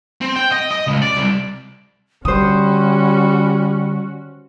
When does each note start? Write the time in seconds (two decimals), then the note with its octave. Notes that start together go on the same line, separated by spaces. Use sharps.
0.21 C4
0.36 G5
0.52 D#5
0.71 D#5
0.87 C#2
1.02 D5
1.17 C2
2.25 D3 G3 C#4 F#4 C5 D#6